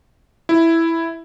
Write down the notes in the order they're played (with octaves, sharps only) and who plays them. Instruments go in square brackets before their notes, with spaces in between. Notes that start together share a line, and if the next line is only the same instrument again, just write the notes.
[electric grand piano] E4